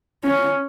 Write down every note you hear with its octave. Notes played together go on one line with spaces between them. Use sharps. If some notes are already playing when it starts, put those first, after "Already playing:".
C#4